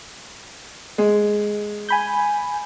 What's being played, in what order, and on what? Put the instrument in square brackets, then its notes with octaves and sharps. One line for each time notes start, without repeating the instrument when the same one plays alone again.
[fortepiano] G#3
[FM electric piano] G#5 B5 G6